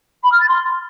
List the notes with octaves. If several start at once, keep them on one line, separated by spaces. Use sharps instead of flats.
B5
F6
A6
C6